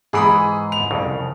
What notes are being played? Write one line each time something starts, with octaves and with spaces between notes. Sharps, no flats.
G#2 E3 G#4 B5 D#6
F7
C2 F2 C#3